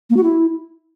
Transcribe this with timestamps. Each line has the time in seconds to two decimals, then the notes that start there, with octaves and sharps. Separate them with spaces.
0.10 A#3
0.17 F#4
0.23 E4